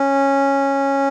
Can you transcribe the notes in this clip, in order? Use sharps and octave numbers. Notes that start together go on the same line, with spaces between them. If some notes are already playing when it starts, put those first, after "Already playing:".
Already playing: C#4